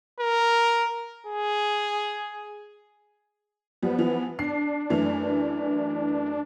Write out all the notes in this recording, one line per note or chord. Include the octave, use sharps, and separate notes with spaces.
A#4
G#4
F3 G3 B3
E3 F3
D4 C7
F#2 E3 A3